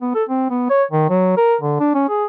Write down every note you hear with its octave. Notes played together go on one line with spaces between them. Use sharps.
B3
A4
C4
B3
C#5
D#3
F#3
A#4
D3
D4
C#4
G#4